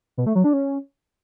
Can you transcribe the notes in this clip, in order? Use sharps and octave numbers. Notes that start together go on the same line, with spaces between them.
B2
A3
F#3
D4
C#4